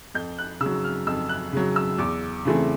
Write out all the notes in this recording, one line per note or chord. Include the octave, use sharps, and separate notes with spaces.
F2 G6
F#6
C#3 E6
F#3
F6
F2 E6
F#6
C#3 F#3
E6
E2 D6
C#3 E3 A3 C4